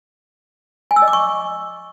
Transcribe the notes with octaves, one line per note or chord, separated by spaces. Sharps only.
G#5
E6
D#5
D6
C#6